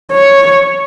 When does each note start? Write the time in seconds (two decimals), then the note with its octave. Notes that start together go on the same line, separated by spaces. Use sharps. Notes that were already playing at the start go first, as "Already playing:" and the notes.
0.12 C#5